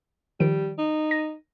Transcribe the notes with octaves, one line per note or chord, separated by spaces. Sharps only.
D#3 F3 G3 D7
D#4
A#6 D#7